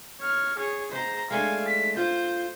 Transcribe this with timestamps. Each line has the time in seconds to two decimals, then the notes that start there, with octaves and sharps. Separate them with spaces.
0.20 C#5 F6
0.58 G#4 C#5
0.91 D2 G#2 C5 A#5
1.31 G#3 A3 D4 F5 G#5
1.68 B6
1.97 F4 C5 G6